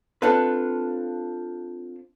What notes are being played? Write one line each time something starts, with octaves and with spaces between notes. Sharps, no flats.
C4 D4 F4 A4 B4